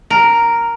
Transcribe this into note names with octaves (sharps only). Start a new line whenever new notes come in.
A#4